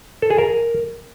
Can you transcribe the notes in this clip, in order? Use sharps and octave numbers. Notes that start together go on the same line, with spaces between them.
A4
G#4
A#4